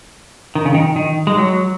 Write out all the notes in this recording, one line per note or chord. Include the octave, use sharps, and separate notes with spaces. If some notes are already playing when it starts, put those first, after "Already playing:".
D#3
C#3
D#3
D#3
G#3
F#3